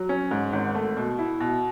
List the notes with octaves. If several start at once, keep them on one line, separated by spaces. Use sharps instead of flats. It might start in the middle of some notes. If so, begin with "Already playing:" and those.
Already playing: F#3
C#4
G#2
G#1
A3
B2
E4
B2